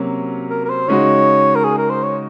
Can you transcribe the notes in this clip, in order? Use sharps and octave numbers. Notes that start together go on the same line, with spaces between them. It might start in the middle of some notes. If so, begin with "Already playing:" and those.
Already playing: C3 F#3 A#3 C#4
A#4
A#4
C5
C#3 G#3 D#4 F#4 C#5
A#4
G#4
A#4
C5
C#5